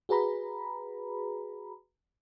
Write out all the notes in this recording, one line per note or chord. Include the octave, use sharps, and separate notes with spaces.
F#4 G#4 B4 A#5 B5